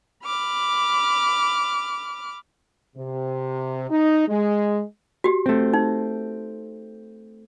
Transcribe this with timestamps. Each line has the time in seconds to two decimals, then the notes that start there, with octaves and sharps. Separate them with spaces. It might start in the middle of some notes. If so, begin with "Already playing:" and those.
0.24 B5 D6 F6
2.97 C3
3.90 D#4
4.28 G#3
5.24 F#4 G4
5.46 A3 C4
5.74 D#4